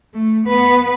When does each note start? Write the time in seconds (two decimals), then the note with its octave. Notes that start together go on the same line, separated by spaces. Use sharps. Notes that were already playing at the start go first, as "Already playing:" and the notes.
0.14 A3
0.48 B3 B4